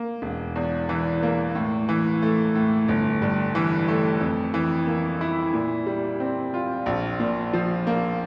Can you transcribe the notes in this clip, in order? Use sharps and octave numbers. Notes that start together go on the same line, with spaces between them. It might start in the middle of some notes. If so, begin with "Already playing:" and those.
Already playing: A#3
E1
E2
E3
A#3
A2
E3
A3
A2
G1
G2
E3
A3
F2
E3
A#3
E4
A#2
G3
C4
F4
A#1
A#2
F3
A#3